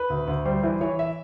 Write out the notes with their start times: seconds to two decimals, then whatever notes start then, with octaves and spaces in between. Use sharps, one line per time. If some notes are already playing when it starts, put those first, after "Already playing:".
Already playing: B4
0.10 D2
0.27 D2
0.45 G3 C5
0.63 E3 C5
0.81 E3 C#5
0.99 E5